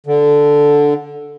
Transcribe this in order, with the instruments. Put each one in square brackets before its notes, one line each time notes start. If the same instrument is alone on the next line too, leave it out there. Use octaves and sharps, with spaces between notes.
[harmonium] D3